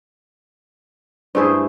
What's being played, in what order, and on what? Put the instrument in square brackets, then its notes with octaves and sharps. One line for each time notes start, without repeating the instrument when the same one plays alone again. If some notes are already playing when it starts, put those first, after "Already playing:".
[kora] G2 A3 E4 [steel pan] G#4 C5